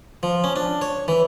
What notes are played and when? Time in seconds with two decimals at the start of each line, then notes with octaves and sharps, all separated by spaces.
0.23 F3
0.44 C#4
0.56 D4
0.82 C#5
1.08 E3